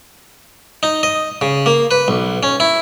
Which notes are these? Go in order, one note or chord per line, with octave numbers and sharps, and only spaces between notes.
D#4
D#5
C#3
A#3
B4
B1
C#4
E4